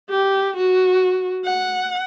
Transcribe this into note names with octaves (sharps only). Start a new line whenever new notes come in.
G4
F#4
F#5